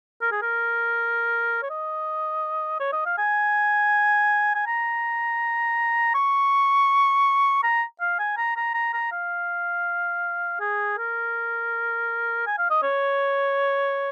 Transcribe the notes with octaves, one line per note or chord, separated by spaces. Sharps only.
A#4
G#4
A#4
C#5
D#5
C#5
D#5
F5
G#5
G#5
A#5
C#6
A#5
F5
G#5
A#5
A#5
A#5
A#5
F5
G#4
A#4
G#5
F5
D#5
C#5